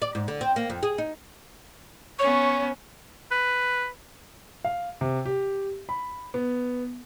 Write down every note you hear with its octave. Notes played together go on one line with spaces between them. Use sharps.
D5
G#2
D3
C4
A#3
F2
G#4
D#4
B3 C#4 C#5 C#6
B4
F5
C3
G4
B5
B3